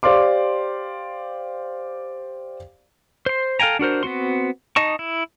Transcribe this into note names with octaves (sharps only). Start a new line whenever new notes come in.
G4 C5 D5 F5 C6 D6
C5 C6
A4 F5 G5 G#5 A#5
D4 F#4 A#4 C5
B3 C4 F#4 C6
D#4 D#5 A5 C#6
E4